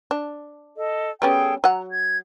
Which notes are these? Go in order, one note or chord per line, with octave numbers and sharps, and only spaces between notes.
D4
A4 D#5
G3 B3 C#4 G#4 A4 G5
F#3 F#5 A#5
G#6